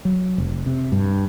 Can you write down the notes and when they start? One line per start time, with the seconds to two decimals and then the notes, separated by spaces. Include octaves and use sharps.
0.05 F#3
0.38 F1
0.66 C3
0.92 G2